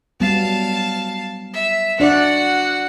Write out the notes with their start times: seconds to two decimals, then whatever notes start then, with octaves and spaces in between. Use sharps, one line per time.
0.20 F#3 G3 B3 F5 A5
1.54 E5
2.00 D4 F#4 D5 F#5